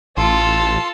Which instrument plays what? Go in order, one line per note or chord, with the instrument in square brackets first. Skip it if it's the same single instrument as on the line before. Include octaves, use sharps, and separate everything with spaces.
[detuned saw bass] A1 [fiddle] F4 A4 [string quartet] A5 [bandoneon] C6